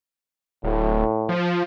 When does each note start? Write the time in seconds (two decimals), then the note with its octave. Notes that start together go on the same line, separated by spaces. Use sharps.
0.64 D1 A2
1.29 F3